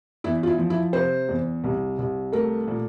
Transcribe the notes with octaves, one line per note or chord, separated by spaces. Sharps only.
E2 E4
F4
E4
F3
E4
C3 C5
E2
C2
C2
A3 A#4
A#2